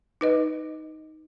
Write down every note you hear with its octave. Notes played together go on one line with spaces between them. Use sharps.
D#4 B4 D#5